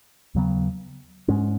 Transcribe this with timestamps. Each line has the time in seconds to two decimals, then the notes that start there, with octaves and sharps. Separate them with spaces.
0.35 D#2 C#3 F#3 B3
1.28 G#2 G#3 C#4